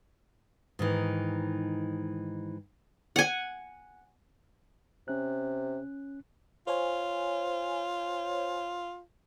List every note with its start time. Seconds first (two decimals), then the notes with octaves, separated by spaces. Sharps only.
0.79 G#2 D#3 E3
3.16 F#5 G#5
5.08 C3 C#4 F#6
6.67 F4 C5 C#5 G#5